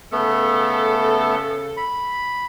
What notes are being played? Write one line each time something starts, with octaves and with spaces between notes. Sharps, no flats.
C#3 A3 B3 A4
B5